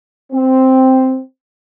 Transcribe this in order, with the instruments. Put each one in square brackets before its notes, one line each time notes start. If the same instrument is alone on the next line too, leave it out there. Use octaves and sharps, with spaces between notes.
[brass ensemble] C4